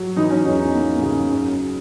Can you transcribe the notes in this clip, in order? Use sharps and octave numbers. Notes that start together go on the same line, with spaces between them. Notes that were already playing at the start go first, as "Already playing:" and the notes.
Already playing: F#3
E3 D#4
C#4
E2 D#4
D#4
A#3
C#3
F#2